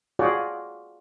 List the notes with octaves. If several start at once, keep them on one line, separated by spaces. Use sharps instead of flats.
F4 F#4 G#4 C#5 D5 F#5